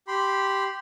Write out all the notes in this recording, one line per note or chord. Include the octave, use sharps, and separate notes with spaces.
G4 B5 C6